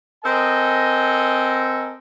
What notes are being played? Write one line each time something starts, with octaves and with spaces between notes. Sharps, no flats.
C4 A4 A#4 D#5 G#5